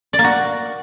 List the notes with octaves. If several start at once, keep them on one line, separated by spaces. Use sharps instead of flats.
D5
A#3
F#4